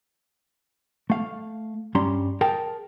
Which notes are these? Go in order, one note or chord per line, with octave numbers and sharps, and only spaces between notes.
A3 F5
G2 G3 C#4 A#5 C6
G#4 A#4 G5 A5